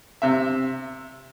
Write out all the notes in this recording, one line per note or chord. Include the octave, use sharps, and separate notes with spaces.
C3 E5